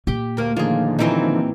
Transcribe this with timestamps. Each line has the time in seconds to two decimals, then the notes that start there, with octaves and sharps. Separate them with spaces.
0.07 A#2 G4 G5
0.37 D2 A#3
0.56 D3 D#3 F3 A#3 F4 G#4
0.99 E3 F#3 A#3 C4 D#4